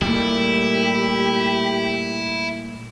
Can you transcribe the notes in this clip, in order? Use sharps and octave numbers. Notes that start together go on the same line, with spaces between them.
A#2 G3 A3 A#3 E4 G4